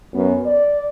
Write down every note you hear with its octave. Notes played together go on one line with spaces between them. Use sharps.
F#2 B3
D5